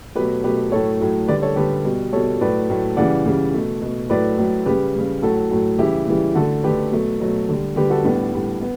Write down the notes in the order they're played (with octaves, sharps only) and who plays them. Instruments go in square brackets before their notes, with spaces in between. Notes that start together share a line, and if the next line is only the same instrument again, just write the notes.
[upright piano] B2 F#3 A3 G4 B4
B2 F#3 A3 G4 B4
A2 F#3 A3 A4 C#5
A2 F#3 A3
D3 G3 B4 D5
A4 C#5
D3 G3 G4 B4
B2 G3
B2 G3 A4 C#5
A2 F#3 A3 B4 D5
A2 F#3 A3
C#3 E3 G3 D5 F#5
C#3 E3 G3
B2 A3
B2 A3
A2 F#3 A3 B4 D5
A2 F#3 A3
C#3 G3 G4 B4
C#3 G3
A2 F#3 A3 F#4 A4
A2 F#3 A3
C#3 E3 G3 E4 G4
C#3 E3 G3
D3 A3 F#4 A4
D3 A3 G4 B4
B2 F#3 A3
B2 F#3 A3
D3 G3
D3 G3 G4 B4
F#4 A4
A2 G3 B3 D4
A2 G3
B3